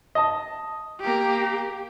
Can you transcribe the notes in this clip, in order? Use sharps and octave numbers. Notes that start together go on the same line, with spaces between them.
D#5 A5
A#3 G4